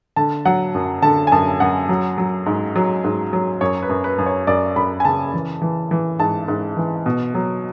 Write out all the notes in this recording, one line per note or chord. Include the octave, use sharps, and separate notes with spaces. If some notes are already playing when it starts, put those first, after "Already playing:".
D3 A5
F#3 F#5
F#2
D3 A5
G#5
F#2 A5
F#2 F#5
F#3
F#3
G#2
F#3
G#2
F#3
F#2 C#5
B4
F#2
B4
F#2
C#5
F#2 D5
F#2 B5
G#5
C#3 A5
E3
E3
E3
G#2 A5
G#2
E3
B2
F#3